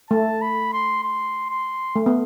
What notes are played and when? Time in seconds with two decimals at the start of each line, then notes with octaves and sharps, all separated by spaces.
0.10 A3 A5
0.42 B5
0.73 C6
1.04 C6
1.50 C6
1.96 A3
2.06 B3